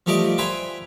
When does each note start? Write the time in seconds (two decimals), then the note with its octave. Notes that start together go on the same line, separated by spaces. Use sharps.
0.06 F3 A3 G4 A#4 D5 D#5
0.38 B4 C5 E5 G5 G#5 A#5